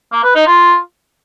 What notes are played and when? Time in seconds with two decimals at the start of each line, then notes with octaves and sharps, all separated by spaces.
0.12 A#3
0.24 B4
0.35 D#4
0.47 F4